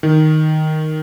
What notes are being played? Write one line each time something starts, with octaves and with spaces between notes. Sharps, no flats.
D#3